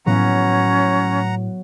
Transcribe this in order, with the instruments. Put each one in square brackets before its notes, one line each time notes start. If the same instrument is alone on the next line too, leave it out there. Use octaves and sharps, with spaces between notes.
[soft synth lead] A2 [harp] F#3 B3 [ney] C#4 [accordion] F#5 A#5